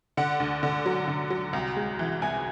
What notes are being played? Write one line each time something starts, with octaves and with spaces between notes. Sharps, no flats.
D3 F#5
D2
D3
F#3
D3
F#3
C2
G#3
E3
C2 G#5